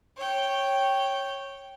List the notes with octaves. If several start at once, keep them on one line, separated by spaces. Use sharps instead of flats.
C#5 G5